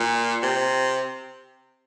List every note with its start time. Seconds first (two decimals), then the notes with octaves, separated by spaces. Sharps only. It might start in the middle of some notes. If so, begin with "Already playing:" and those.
Already playing: A#2
0.43 C3